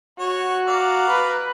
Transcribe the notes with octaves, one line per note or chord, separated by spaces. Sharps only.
F#4 C#5
A#4 D5 F5
B4